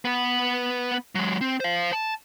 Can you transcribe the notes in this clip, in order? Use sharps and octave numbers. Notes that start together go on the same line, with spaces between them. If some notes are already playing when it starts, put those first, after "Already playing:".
B3 B4
F#3 G#3
C4
C5 F5
A5